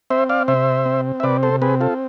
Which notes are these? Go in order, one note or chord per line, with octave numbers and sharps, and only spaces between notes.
C4 C5 E5
D5 F5
C3 C5 E5
C4
E5
C3 B4 D5
A4 C5
C4 G#4 B4
F4 A4